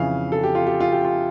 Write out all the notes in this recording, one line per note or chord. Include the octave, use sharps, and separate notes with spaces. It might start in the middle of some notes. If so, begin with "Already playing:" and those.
Already playing: F2 C#3 E3 F5
A4
G4
F4
G4
F4
G4
F4